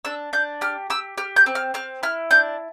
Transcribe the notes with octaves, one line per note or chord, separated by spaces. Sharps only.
D4 E6
D4 G6
G4 F6
G4 E6
G4 F6
G6
C4
F6
C4 F6
E4 F6
D4 G6